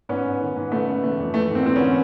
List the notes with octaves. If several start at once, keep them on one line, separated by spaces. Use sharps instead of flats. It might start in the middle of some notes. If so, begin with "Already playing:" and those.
G#2 B3 C#4
G#2
D#3
G#2
C#3 A3 B3
C#3
E3 A3
F2
E3 A3
G#2
A#3 C4
G#2 C4
B3 C#4
E3